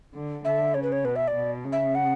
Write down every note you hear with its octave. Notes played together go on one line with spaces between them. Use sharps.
D3
D3 E5
C#3 C#5
B4
C#5
B2 B4
E5
D5
B2
C#3
E5
F#5